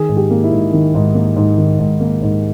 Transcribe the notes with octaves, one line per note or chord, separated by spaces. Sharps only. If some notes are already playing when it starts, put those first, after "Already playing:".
Already playing: D#3 G#4
G#2
G4
A#3
E4
G#2
D#3
G#2
A#3
G#2
D#3
G#2
A#3
G#2